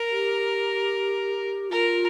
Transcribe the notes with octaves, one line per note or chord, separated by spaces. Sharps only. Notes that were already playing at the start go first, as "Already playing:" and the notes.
Already playing: A#4
G4
F4 A#4